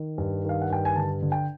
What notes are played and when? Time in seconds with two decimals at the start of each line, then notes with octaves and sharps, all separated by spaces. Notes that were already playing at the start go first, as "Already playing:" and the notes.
Already playing: D#3
0.18 G2
0.44 D#3
0.49 F5
0.62 F#5
0.70 G2 G5
0.85 G#5
0.96 D3 A5
1.22 D3
1.32 G5